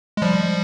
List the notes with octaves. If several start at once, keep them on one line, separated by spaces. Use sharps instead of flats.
G#3
F3 G3